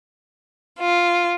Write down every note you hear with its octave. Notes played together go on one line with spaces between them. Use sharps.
F4